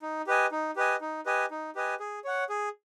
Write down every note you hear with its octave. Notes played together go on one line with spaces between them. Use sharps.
D#4
G4 B4 D#5 G#5
D#4
G4 B4 D#5 G#5
D#4
G4 B4 D#5 G#5
D#4
G4 B4 D#5 G#5
G#4
C#5 F#5
G#4